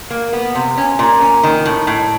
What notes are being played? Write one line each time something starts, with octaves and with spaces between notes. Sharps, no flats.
A#3
B3
C3
C#4
A#2
C#4
D#3
A2
A2